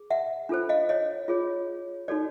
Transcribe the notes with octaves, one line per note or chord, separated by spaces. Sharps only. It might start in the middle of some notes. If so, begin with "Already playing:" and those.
Already playing: G#4
E5 F#5
D4 F4 A4 C5
D#5 F5
C#5 D#5
F4 G#4 C#5
D#4 F#4 A4 C#5 D5